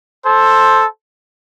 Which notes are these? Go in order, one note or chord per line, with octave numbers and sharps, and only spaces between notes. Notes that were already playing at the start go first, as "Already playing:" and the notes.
A4 C5